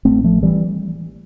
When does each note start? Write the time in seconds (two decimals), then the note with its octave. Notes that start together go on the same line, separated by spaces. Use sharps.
0.05 A1 A2 A3 C4
0.24 F3 A3
0.42 E3 G3